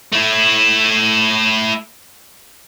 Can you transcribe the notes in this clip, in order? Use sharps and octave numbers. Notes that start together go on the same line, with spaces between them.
A3 E4